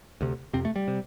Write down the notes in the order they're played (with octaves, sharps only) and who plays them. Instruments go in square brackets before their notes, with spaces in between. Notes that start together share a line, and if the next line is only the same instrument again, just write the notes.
[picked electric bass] D2 C3
F2 C3 C4
A3
G3
C3